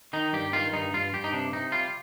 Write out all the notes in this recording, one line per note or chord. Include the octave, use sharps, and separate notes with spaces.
D#3 D#4
G2 G4
D#3 F4
G2 D#4
G2 F4
G2 G4
D#4
C3 D4
C3 D#4
G3 F4